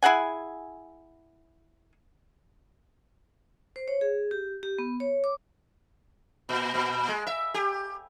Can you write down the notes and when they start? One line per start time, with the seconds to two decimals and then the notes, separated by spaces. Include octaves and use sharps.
0.03 E4 G#4 F#5 G#5
3.76 C5
3.88 C#5
4.01 G#4
4.31 G4
4.63 G4
4.78 B3
5.00 C#5
5.24 D6
6.49 A#2
6.74 A#2
7.08 G#3
7.27 E5
7.54 G4